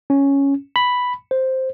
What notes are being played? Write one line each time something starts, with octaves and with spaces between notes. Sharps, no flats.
C#4
B5
C5